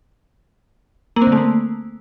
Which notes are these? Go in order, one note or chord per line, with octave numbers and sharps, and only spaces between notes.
A#3
C4
D3
A3
A#3